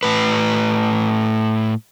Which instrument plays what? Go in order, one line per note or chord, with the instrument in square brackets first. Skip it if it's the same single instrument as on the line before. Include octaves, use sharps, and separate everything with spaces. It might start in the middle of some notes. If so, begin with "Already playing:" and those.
[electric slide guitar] A2 B4